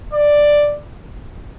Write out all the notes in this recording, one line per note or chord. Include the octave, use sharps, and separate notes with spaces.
D5